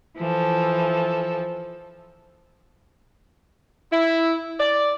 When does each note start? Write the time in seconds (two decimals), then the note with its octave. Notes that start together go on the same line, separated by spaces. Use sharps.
0.17 E3 F3 A4
3.92 E4
4.60 D5